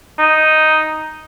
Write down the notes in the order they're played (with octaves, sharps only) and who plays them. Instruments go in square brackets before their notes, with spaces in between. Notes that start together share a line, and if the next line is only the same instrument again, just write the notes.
[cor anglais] D#4